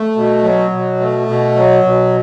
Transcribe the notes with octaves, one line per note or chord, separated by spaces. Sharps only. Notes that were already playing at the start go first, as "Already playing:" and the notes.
Already playing: A3
B2
F#3
B2
A3
B2
F#3
B2